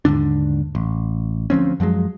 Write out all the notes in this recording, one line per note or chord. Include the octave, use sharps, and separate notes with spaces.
D#2 G#2 D3 D4
A1
D2 F3 C4 C#4
F#2 F3 F#3 G#3